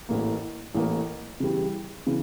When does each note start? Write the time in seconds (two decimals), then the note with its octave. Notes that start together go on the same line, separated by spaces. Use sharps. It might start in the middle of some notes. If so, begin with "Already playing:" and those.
0.09 A1 A2 E3 A#3
0.74 A1 A2 E3 A#3
1.40 C#3 E3 G3
2.07 C#3 E3